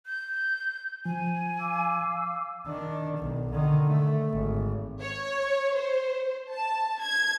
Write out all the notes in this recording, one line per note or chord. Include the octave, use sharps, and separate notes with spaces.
G6
F3 G#5
F5 D6 E6
D#3 D4
B1
D3 D#3
A3
G#1
C#5
C5
A5
G#6